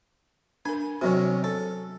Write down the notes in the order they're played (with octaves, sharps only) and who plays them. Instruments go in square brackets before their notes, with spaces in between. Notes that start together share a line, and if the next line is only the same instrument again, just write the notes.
[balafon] D4 A#4 [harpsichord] G#5
[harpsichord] C3 D#3 C#4 [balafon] F#3 F#4
[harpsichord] A4